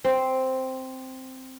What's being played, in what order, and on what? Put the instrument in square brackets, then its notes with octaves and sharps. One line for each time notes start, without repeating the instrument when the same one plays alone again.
[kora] C4